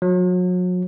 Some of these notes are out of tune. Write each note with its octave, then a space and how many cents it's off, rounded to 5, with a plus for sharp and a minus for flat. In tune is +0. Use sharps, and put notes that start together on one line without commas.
F#3 -35